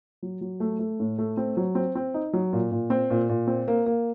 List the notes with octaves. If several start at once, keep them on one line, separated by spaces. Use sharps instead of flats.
F#3
F#3
A3
A3
A2
A3
C4
F#3
C4
C4
D#4
F#3
A#2
A#2
C4
A#2
A#2
C4
A#3
A#3